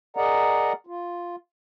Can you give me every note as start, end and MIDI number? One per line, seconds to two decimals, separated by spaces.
0.16 0.73 68
0.16 0.73 70
0.16 0.73 74
0.16 0.73 75
0.16 0.73 78
0.16 0.73 82
0.87 1.36 65